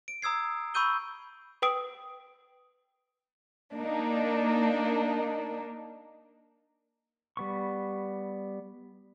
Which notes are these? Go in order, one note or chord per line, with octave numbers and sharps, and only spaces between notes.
D7
A#5 D#6 E6 G#6 C7
B5 C#6 E6 G6 D#7 G7
B4 G5 D#6 D7
A#3 D4 D#4
G3 B3 C#6